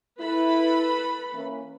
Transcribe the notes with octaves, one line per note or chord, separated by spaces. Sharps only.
E4 A4 B4 B5
E3 A#3 C#4